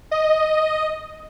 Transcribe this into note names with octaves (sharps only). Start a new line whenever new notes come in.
D#5